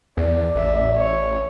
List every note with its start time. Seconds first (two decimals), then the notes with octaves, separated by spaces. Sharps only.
0.17 E2 D5
0.55 A1 E5
0.97 C#5